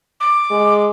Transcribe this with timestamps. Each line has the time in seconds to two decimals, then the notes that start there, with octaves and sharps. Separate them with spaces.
0.20 D6
0.51 G#3